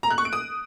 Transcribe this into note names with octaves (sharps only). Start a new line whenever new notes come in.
A#5
F#6
C#6
D7
D#6